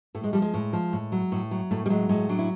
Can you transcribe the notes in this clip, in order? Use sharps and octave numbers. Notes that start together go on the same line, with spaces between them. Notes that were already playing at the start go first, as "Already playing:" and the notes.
A2 A3
G#3
F3 G3
G#3
A2
F3
A2
F#3
A2
F#3
A2 A3
G3
F#3 G#3
A2 G#3
F#3 D4
E4